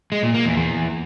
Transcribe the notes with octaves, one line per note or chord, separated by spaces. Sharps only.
G#3
A#2
A#3
E2
E2